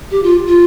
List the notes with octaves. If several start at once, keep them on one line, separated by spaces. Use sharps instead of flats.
G4
F4
F4